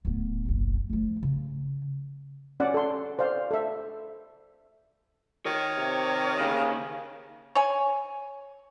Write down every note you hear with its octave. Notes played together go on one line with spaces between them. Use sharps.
D1 B3
F#1 B1
F3 A3
C#3
C#4 D5 F#5
A4 C6
C5 D5 F5
A4 E5
D#3 C#5
C3
D#2 C#3
C#5 G#5